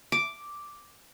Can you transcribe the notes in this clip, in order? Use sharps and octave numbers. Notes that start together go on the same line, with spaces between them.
D6